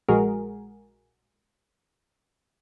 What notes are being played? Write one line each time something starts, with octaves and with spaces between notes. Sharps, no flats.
A#1 G#3 F#4 G#4 A#4